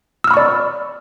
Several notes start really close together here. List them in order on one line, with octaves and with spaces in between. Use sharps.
E6 F6 B5 C#6 D5